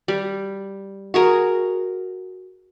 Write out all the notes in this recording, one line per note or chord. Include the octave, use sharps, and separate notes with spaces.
G3
F#4 G#4 A#4